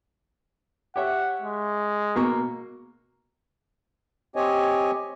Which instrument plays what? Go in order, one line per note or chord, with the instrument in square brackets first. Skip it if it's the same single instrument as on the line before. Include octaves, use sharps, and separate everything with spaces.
[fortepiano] G4 C#5 E5 [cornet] F#5
[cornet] G#3
[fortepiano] B2 A#3 C#6
[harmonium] C4 G4 C#5 D#5 G#5